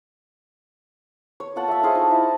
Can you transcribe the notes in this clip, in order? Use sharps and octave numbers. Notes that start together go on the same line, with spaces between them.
C#5
F4 A4 F#5 A5
A3 E5
F4 G#4 C5 D#5
D#4
E4 A5